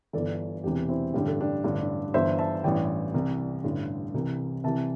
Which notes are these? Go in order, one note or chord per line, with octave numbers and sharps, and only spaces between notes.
G1 G2 E3 A4 D5
E1 E2 C3 E3 D4 G4
C4 E4
A1 G2 D3 G4
A4
D4 G4
A1 G2 D3 D4
D4
G1 G2 E3 C5 E5
E5 A5
A1 G2 E3 D5 G5
C2 C3 E3
A1 G2 D3
C2 C3 E3
C2 C3 E3 E5 A5